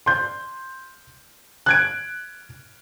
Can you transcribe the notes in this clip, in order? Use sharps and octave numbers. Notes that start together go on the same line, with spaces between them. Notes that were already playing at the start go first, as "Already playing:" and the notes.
C6 G6
F#6 G#6 D7